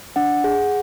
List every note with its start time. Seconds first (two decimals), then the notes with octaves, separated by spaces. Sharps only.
0.16 D4 F#5
0.44 G#4